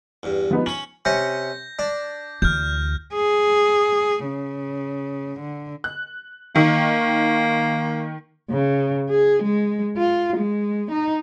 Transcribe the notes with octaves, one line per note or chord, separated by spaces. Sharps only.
E2 G2
F3 B3 D#4
C#4 C#5 F#7
C3 C#4 G6 A#6
D4
D2 E3 F6 G6
G#4
C#3
D3
F#6
D#3 A#3
C#3
G#4
G#3
F4
G#3
D#4